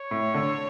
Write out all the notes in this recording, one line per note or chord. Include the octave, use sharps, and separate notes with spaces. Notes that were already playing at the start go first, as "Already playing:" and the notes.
Already playing: C#5
A2
D3